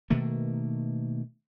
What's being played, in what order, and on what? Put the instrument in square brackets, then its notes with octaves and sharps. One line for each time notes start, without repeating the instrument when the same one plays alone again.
[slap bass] B2 D#3 A3 A#3